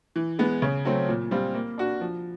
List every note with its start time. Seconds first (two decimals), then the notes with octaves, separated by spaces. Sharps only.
0.16 E3
0.39 G#3 B3
0.62 C#3
0.85 F#3 A3 C4
1.08 A#2
1.31 G3 C4 F4
1.54 A#3
1.78 D4 F#4
2.01 F3